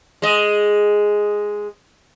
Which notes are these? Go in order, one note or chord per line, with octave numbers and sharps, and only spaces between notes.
G#3 D#5